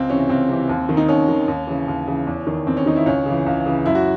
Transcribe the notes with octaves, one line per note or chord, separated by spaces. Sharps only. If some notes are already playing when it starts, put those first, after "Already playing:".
Already playing: C#2 C4
C3 E3 C#4
C#2 C4
C3 E3
D#2
D#3
D#4
D#2 C#4
D#3
D#2
C#3 E3
D#2
C#3 E3
E2
D#3
E2 C4
C#4
D#3 D#4
E4
C#2 C#4
C#3 E3
C#2
C#3 E3
F#2 E4
F#4